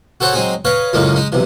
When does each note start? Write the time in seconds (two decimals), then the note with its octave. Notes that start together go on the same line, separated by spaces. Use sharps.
0.21 F#4 A4 C5 C#5 F#5
0.33 F#3 G#3 C4 D#4 G#4
0.65 B4 C#5 D#5 F5
0.93 C#2 F#2 A2 G#3 A#3 C#4
1.16 G#3 D#4
1.32 B1 C3 E3